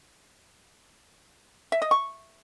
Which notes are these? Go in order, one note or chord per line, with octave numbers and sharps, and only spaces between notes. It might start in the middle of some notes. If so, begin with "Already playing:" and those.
E5
D#5
C#6